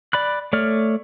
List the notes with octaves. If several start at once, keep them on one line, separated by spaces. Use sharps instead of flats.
D5 B5 F#6
A3 C#5 D5 F6